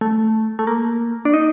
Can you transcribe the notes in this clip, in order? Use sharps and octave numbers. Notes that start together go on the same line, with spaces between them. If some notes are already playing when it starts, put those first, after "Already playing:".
A3
A3
A#3
D4
D#4